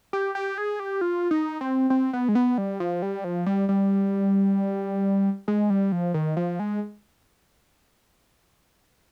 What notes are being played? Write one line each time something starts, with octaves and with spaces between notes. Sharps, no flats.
G4
G4
G#4
G4
F4
D#4
C4
C4
B3
G#3
B3
G3
F3
G3
F3
G3
G3
G#3
G3
F3
D#3
F3
G#3